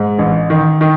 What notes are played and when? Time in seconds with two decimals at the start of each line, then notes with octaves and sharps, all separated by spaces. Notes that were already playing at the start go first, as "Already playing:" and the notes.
Already playing: G#2
0.19 A1
0.50 D#3
0.81 D#3